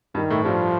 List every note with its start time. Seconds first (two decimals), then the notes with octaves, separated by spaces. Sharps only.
0.15 G2 D#3 G3
0.30 A2 A3
0.45 G2 F3 G3